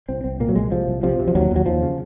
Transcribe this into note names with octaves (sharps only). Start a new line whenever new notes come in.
C2 C4
C2 C4
A#2 A#3
F#3
C2 G#3
C3 F3
C2
C3 F3
C3
F3
D#2 F#3
D#2 F#3
D#2 F3
C#3